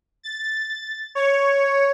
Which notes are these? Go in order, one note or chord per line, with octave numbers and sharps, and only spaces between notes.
A6
C#5